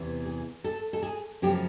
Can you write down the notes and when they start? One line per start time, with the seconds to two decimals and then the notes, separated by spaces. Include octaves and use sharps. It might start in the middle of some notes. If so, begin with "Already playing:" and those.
Already playing: E2 C3 E3
0.26 G#4
0.64 A4
0.93 A4
1.03 G#4
1.42 F#2 C#3 F3 A3 G4